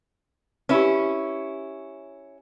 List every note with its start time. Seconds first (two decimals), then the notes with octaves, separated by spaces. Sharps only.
0.69 C#4 E4 G4 B4